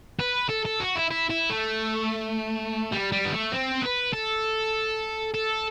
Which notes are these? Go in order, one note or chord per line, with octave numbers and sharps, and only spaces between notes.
B4
A4
A4
F#4
E4
E4
E4
A3
G3
G3
B3
A3
C4
B4
A4
A4